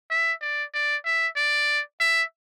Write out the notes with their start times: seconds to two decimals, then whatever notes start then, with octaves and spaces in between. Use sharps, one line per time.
0.11 E5
0.42 D5
0.74 D5
1.05 E5
1.37 D5
2.00 E5